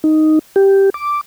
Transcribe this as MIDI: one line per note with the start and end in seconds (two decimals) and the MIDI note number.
0.04 0.39 63
0.56 0.90 67
0.94 1.21 86